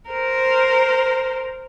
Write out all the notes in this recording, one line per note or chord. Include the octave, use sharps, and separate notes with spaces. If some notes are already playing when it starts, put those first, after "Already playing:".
A#4 C5